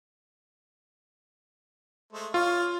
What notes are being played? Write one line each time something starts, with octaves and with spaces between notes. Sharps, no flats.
G#3 A3 C5
F4 C#5 F6